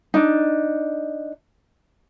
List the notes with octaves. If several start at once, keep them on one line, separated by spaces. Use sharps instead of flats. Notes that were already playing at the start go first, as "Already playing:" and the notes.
D4 D#4